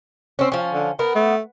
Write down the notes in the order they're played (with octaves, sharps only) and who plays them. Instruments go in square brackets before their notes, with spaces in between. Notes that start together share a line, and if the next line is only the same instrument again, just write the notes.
[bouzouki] C4 C#4
F3 C#4
[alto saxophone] D3
[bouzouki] B3 [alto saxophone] A#4
[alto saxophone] A3